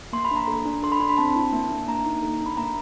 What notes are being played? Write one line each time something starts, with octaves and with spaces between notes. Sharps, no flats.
A#3 C6
B5
D4 A#5
A4
D4
A4 C6
B5
D4 C6
B5
C4 A5
E4
A#3
D4
A#3 A#5
D#4
A4
D4
B5
A#3 A#5